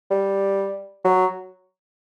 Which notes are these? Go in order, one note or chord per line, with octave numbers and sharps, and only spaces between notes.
G3
F#3